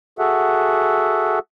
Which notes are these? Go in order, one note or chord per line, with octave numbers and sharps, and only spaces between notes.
F#4 G#4 A4 E5 F#5